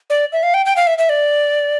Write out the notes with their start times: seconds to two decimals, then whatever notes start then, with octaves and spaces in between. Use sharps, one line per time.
0.10 D5
0.33 E5
0.43 F5
0.54 G5
0.66 G5
0.76 F5
0.87 E5
0.98 E5
1.09 D5